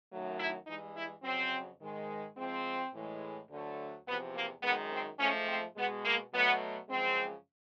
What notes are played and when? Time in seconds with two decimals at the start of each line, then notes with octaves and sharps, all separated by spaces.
0.10 F#2 D#3 F#3 A3
0.38 E4
0.66 G2 E3 G#3 D#4
0.96 E4
1.23 F2 C#3 F#3 C4
1.80 G#2 D#3 G#3
2.36 G#2 F3 G#3 C4
2.93 A2 E3 G#3
3.49 D2 D3 F#3 A3
4.06 E2 C3 F3 B3
4.34 A#3
4.63 F#2 D#3 G#3 B3
4.91 C4
5.18 G#2 F3 A3 C#4
5.48 C4
5.76 B2 G#3 B3
6.04 A#3
6.32 B2 F#3 A3 B3
6.89 F#2 C#3 F3 G#3 C4